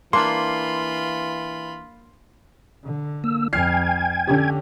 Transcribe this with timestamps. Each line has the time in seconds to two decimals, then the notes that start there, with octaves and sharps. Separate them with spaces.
0.13 E3 A#3 D4 F4 B5 C6
2.84 D3
3.24 A#3 E6
3.53 F2 G5 G#5 F6 G#6 C7
4.27 D3 C#4 G4